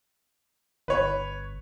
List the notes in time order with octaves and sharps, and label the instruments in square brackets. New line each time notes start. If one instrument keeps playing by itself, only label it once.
[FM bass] G1 [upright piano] B4 C#5